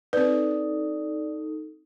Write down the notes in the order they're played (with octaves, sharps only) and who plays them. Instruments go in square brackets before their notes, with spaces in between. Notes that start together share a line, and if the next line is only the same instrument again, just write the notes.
[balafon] C4 B4 [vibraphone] D#4 A4 [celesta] D5